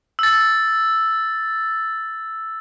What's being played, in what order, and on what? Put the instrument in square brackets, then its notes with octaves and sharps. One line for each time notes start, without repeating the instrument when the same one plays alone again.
[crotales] E6 A6